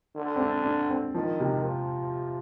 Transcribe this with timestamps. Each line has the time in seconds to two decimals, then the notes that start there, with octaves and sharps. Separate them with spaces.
0.16 D3
0.36 C4
0.41 D4
0.65 D4
0.90 C4
1.14 D#3 F3
1.40 C3
1.64 F3